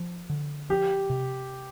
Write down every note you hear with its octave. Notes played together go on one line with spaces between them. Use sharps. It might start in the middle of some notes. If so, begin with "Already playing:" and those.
Already playing: F3
D3
F3 G4
C3